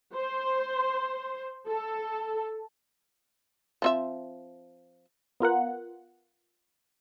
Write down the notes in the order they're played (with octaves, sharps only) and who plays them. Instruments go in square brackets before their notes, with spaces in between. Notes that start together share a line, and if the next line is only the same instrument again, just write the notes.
[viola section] C5
A4
[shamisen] F3 C4 E5
[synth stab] B3 F4 A#4 F#5